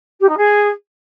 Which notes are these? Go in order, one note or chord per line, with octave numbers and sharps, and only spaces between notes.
G4
D#4
G#4